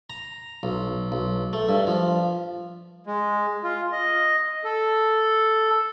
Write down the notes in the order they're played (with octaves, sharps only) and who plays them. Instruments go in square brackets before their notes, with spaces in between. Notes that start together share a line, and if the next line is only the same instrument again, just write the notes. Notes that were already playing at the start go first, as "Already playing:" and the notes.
[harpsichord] A#5
B1
B1
A3
G2
F3
[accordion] G#3
F4
D#5
A4